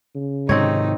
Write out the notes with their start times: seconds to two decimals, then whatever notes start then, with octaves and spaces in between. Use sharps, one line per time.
0.15 C#3
0.49 G#2 C3 D#3 C4 D#4 C#5